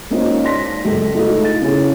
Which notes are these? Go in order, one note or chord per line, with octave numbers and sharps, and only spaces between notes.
G#3 A#3 C#4 D#4 F4 C5
D5 A5 C6 A#6 B6
C#2 F#2 G#3 A4
A3 D#4 F4 F#4 A4
E4 A6
C#3 C#4 E4 G#4